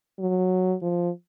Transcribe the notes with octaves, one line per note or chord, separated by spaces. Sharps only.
F#3
F3